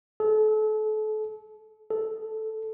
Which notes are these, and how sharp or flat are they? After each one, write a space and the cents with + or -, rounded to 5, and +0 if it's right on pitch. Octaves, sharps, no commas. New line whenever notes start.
A4 -35
A4 -5